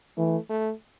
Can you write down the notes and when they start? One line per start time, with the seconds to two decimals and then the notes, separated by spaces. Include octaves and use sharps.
0.17 E3 A3
0.50 A3